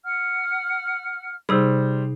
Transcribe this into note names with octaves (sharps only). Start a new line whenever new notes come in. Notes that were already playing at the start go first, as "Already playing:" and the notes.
F#5 F6
C3 G3 D#4 G#4 C5